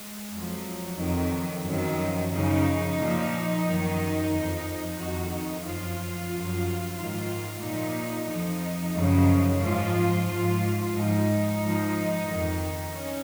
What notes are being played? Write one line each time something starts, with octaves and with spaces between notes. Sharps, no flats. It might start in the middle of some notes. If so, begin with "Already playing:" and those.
Already playing: G#3
F2 F3 F#3
F2 D#3
F#2 D#3 F3
F#2 C#3 F3 D#4
A#2 F3
F#2 D#3
F2 F3
F2 D#3 F#4
D#4
F#2 F3 F4
F#2 F3
G#2 D#3 F4
A#2 F3 D#4
F2 F3 D#4
F#2 C#3 F3
G#2 F3 F4
G#2 F3
G#2 F3 D#4
G#2 F3
F2 D#3
C#4